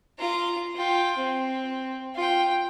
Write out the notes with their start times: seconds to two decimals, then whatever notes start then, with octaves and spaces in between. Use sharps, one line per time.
0.19 F4 A#5
0.75 F4 G5
1.17 C4
2.15 F4 G5